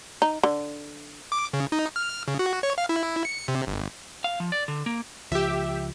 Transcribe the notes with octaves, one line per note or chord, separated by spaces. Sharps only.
D#4
D3
D6
C#3
D#4
F6
C#3
F#4
C#5
F5
E4
C#7
C3
G1
F5
F3
D5
D3
A#3
C#2 F3 G4 E5